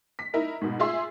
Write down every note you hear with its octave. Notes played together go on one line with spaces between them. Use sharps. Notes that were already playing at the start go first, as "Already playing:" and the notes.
B6
D#4 E4 A#4
G#2 B2
F4 G#4 E5 C6